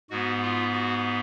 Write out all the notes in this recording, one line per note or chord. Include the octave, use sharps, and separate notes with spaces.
G#2 G#3 B3 F#4
F4
F#4